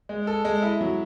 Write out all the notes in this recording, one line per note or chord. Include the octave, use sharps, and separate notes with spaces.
G#3
A4
G#3
E4
F#3